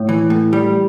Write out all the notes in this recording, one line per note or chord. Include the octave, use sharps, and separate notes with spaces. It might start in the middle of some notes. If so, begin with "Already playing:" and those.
Already playing: A2
E3
A2
G3